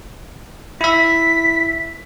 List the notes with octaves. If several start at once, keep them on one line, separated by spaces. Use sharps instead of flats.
E4 E5 B6